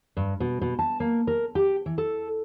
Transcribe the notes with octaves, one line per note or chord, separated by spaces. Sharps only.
G2
B2
B2
A5
A#3
A#4
G4
E3
A4